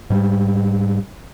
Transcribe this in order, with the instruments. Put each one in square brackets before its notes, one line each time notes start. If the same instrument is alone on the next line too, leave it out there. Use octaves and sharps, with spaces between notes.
[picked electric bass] G#2 G3